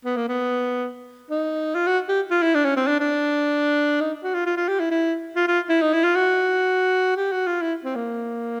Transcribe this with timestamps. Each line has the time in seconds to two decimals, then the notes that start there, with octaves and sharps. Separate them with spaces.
0.05 B3
0.17 A#3
0.28 B3
1.30 D#4
1.75 F4
1.87 F#4
2.09 G4
2.31 F4
2.42 E4
2.55 D4
2.65 C#4
2.77 C4
2.87 D4
3.00 D4
4.01 D#4
4.23 F#4
4.34 F4
4.46 F4
4.57 F4
4.68 G4
4.80 E4
4.91 E4
5.36 F4
5.48 F4
5.69 E4
5.82 D#4
5.93 E4
6.04 F4
6.16 F#4
7.17 G4
7.32 F#4
7.47 F4
7.62 E4
7.85 C4
7.95 A#3